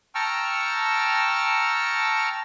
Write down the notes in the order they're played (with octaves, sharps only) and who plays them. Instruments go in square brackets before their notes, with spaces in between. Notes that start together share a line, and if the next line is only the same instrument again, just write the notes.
[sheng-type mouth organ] G5 A5 A#5 C#6 E6 F6